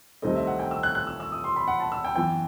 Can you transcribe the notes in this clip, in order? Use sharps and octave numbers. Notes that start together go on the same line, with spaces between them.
C2 C3 D#3 A3 C4 D#5
E5
F#5
G5
E6
F#6
F#6
E6
E6
D#6
C6
B5
F#5
A5
E6
G5
F#2 E3 B3 G5